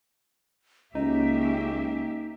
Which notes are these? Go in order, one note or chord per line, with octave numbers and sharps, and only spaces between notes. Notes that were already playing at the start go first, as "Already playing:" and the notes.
C#2 A#3 C#4 D#4 G4 E5